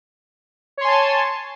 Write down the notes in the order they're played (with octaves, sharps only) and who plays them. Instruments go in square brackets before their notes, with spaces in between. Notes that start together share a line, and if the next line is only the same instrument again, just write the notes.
[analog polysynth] C#5
C6
G#5
A5